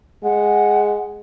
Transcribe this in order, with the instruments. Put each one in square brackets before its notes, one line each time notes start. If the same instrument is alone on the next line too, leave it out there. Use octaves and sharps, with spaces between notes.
[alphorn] G#3 [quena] F#5